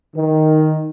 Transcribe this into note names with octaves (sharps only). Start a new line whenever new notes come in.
D#3